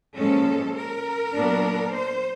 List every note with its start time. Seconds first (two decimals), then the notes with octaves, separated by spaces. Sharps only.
0.17 A#2 F3 G#3 C#4 A4
0.75 A#4
1.34 A#2 F#3 B3 D4
1.93 C5